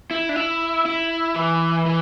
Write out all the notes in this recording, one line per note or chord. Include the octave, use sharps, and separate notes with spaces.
E4
D4
E4
E4
E3
E3